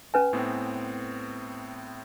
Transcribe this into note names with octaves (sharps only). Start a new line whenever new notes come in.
C#4 B4 G#5
A2 B3 C4